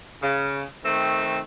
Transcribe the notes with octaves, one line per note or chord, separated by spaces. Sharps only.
C#3
D#3 A3 C4